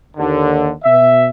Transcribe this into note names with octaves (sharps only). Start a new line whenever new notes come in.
D#2 D3
B2 E5